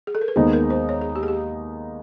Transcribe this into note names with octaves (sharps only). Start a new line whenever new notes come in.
G#4
A4
A#4
B4
D#2 D#3 G#3 B3 D#4 C5
A#4
C5
C#5
G#4
G4
G#4
G4